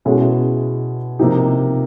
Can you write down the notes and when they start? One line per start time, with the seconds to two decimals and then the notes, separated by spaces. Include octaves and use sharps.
0.05 B2 G#3 C#4 E4 G#4
1.19 C3 F3 A#3 D#4 G4